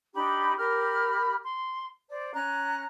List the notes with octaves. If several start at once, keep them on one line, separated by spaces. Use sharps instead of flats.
D4 D#4 G4 B5
G4 A#4 B5 F6
C6
C5 D5
C#4 A#5 F#6